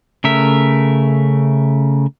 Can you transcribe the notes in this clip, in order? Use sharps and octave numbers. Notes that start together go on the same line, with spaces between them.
C#3 A3 A#4 E5